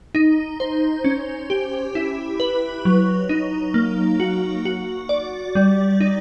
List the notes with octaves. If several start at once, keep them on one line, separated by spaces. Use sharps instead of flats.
D#4
C5
C#4
G4
E4
B4
F#3
D#4
A#3
F#4
F#4
D5
G3
D#4